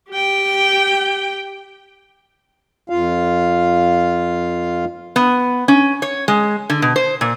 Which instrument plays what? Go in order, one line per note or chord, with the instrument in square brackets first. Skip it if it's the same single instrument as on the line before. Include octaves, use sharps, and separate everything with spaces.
[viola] G4 G5
[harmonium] F2 F4 F5
[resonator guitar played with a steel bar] B3
C#4
C#5
G#3
D3
B2
C5
A#2